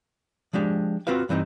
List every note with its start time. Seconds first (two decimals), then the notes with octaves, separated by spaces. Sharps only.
0.53 F3 G#3 D4 G4
1.07 C4 F4 F#4 B4 F5
1.29 G2 E3 C4 D4 D#4